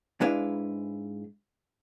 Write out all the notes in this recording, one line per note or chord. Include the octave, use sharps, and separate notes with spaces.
G#2 G#3 D4 E4 B4 F5